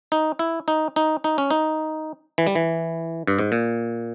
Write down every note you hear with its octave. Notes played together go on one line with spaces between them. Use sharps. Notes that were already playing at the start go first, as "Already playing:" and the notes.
D#4
E4
D#4
D#4
D#4
C#4
D#4
E3
G3
E3
G2
G#2
A#2